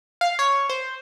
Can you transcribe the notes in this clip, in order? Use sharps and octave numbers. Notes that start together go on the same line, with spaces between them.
F5
C#5
C5